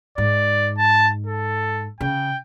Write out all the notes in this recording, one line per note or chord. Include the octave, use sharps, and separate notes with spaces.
G#2 D5
A5
A4
C#3 G5